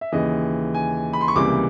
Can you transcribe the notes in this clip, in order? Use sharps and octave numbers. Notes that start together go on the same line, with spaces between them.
E5
D#2 C#3 E3 D#5
G#5
B5
C6
C#6
C#2 C3 E3 G3 A#3 D6